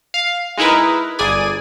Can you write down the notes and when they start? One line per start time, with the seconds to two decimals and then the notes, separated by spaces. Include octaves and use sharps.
0.14 F5
0.58 G#3 D#4 E4 A#4 B4
1.19 G1 G#4 D5 G#5 D#7